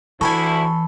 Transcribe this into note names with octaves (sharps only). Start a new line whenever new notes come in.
D2 E3 E4 A4 G#5 B5 C#6